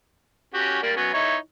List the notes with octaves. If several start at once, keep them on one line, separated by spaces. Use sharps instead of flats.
C#4 F#4 G4
G3 A#3 D5
F#3 B3 C#4
D#4 E4 C#5